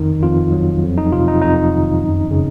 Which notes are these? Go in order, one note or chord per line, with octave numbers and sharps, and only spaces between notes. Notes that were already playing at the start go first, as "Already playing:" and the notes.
Already playing: F2 D#3 D#4
F2 F4
F#3
F2
D#4
C3 F4
D#4
F2 D#4
D#3
F#2
C#3